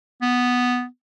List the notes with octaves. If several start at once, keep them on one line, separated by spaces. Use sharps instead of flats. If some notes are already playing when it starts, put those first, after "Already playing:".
B3